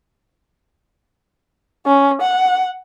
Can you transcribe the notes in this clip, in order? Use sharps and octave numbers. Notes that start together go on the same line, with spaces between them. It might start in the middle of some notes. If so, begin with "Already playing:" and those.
C#4
F#5